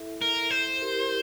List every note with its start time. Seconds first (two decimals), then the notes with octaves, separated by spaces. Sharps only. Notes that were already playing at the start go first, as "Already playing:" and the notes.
Already playing: E4 A4 E5
0.22 A#4
0.51 C5
0.81 E4 G4 A#4